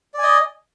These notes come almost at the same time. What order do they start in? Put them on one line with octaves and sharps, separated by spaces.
D5 G#5 D#5